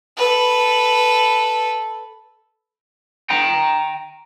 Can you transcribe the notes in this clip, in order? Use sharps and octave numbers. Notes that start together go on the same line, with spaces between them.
A4 B4
G5 A#5